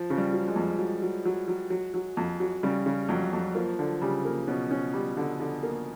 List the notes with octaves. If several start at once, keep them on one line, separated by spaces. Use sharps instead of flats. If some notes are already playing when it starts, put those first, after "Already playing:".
Already playing: F3
C#3
G3
F#3
G#3
F2
F#3
F#3
F#3
F#3
F#3
F#3
F2
F#3
C#3 G3
C#3
F2 F#3
F2
F3 A#3
D3
C#3 G3
A#3
B2 C#4
C#4
G3
D3
D3
A#3